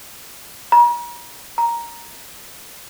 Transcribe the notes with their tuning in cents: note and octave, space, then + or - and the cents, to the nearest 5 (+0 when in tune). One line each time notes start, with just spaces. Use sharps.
A#5 +40
A#5 +5